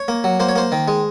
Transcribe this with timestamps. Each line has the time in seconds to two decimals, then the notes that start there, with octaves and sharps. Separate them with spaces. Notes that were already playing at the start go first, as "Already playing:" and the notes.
Already playing: C#5
0.08 A#3
0.24 F#3
0.40 A#3 C5
0.49 C#5
0.56 A#3 C5
0.72 D#3
0.88 G#3